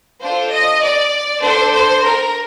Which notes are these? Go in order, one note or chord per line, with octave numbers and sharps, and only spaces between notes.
D4 F4 A4 C5
D#5
D5
D4 A4 C5
C5
A#4